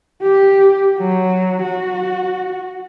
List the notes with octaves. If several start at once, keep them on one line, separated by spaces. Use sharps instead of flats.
G4
F#3
F#4